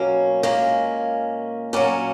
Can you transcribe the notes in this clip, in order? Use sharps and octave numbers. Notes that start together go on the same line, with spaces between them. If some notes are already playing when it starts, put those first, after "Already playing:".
Already playing: B2 F#3 A#3 C#4
A#2 G#3 A#3 C#4
A#2 F#3 A#3 C#4